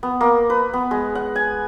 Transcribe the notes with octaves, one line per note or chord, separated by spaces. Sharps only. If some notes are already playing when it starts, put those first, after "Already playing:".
B3
A#3
B4
B3
G#3
F#5
G#5